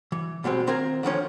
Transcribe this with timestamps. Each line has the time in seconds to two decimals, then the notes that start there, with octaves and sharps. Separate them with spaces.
0.12 E3
0.44 B2 G3 G#3 C4
0.67 D#3 C4 F4 A#4 G#5
1.03 D3 D#3 F3 C#4